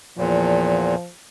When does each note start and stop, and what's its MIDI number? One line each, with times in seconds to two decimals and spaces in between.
0.18 0.95 40
0.18 0.95 46
0.18 1.08 53